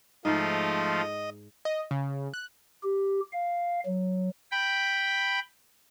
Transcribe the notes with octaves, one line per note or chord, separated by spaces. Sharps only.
G#2 F3 A3 F4 D#5
D#5
C#3
F#6
G4
F5
F#3
G5 B5